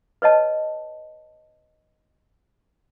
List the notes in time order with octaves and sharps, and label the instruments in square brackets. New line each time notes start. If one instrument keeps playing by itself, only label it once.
[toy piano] B4 C#5 D#5 A5